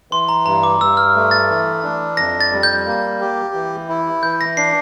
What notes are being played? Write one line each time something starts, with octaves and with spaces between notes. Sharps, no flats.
E3 C6
A#5
G2 A#5
D6
G2 E6
F6
A3
A6
E3
D4
F2 A#6
A6
G3
G6
A#3
G4
E3
E4
E3 G6
A#6
D4 C7